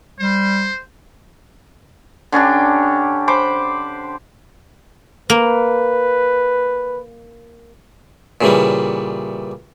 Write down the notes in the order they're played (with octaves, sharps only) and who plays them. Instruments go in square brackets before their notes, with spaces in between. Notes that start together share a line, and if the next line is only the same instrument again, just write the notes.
[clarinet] G3 [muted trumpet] C5
[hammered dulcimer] D3 C#4 D4 G4
C5 B5 D6
[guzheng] A#3 [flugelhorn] B4
[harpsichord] A#2 C#3 E3 G3